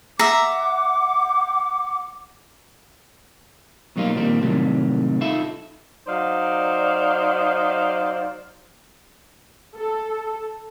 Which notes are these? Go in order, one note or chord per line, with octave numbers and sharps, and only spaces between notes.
E5 F#5 A#5 D6
B2 F#3 G3 A#3 D#4 F4
A#2 D#3 F3 G3 A#3 C4
A2 C3 D#3 F#3 G3
D#4 F4 A4 E5
F#3 D#4 C5 D5 F5
A4